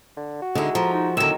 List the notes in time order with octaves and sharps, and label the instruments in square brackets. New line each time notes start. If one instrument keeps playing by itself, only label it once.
[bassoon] D3
F#4
[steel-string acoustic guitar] D3 D#4 [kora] G#3 E4
[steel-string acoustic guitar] F3 [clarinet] A#5
[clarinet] D#4
[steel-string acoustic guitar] E2 D3 [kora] D#3 F#3 [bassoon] D#4 [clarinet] E6